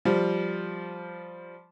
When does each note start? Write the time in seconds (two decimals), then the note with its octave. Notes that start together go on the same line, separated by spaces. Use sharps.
0.05 F3 G3